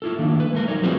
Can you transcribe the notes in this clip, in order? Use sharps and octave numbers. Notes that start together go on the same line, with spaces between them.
E4 F4 A4
D#3 A#3 D4
B4
G#3 A3 A#4
F2 C#3 F#3 D#4 C#5
C4 F4 F#4 G#4 B4 C5